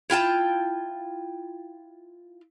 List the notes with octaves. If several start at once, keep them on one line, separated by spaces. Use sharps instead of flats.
E4 F4 G5 A5